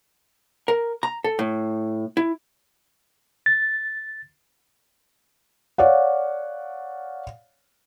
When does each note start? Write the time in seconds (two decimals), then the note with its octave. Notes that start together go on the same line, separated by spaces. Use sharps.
0.68 A#4
1.03 A#5
1.24 A4
1.39 A2
2.17 E4
3.46 A6
5.78 C#5 D5 F5 F#5